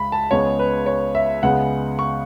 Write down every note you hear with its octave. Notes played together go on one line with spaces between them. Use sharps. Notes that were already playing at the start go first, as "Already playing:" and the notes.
Already playing: C#2 G#3 B5
A5
C#2 C#3 G#3 B3 C#5
B4
C#5
E5
C#2 C#3 G#3 B3 F#5
C#6